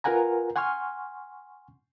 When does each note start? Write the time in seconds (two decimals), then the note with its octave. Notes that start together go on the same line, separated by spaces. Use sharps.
0.04 F4 A#4 B4 F#5 G#5 A#5
0.56 F#5 G#5 C6 C#6 F6